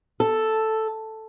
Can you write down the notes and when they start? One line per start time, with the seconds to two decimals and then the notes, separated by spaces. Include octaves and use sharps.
0.20 A4